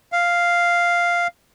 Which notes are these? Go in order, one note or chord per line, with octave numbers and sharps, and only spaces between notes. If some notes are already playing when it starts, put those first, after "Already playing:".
F5